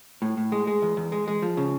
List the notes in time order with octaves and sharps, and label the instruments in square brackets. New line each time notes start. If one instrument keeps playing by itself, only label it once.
[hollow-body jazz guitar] A2
A2
G#3
G#3
E2
E2
G#3
G#3
F3
C#3